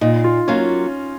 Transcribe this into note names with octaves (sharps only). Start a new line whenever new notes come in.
A#2 D#4
F4
F#3 A#3 C#4 F4